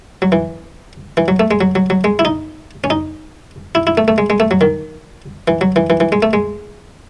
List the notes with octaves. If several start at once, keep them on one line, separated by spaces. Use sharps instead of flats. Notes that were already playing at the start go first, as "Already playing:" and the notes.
F#3
E3
E3
F#3
A3
G#3
F#3
F#3
F#3
G#3
E4
D#4
C#4
D#4
E4
E4
A3
A3
G#3
G#3
A3
F#3
D#3
E3
F#3
E3
E3
E3
G#3
A3
G#3